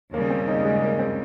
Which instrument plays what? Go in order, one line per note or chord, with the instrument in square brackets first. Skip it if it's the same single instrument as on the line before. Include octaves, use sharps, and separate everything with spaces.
[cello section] D#2 C#3 G3 [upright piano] A#3
[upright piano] C4
D#4
G#3
A#3
C4